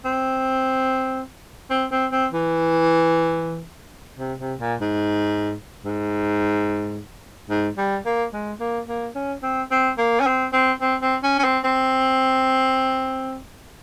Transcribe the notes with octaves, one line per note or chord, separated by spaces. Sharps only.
C4
C4
C4
C4
E3
C3
C3
A#2
G#2
G#2
G#2
G3
A#3
G#3
A#3
A#3
C#4
C4
C4
A#3
C#4
C4
C4
C4
C4
C#4
C#4
C4
C4